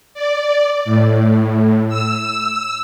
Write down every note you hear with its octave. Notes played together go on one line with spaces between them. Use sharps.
D5
A2
E6